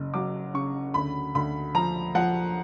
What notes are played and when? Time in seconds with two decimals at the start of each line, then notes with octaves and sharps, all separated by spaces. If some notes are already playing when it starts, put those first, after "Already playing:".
Already playing: F#1 C#3
0.14 F#3 D6
0.54 C#3 C#6
0.94 D2 B5
1.35 D2 B5
1.75 F3 A#5
2.15 F3 F#5